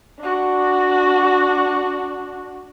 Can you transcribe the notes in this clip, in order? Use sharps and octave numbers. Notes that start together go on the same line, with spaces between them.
D4 F#4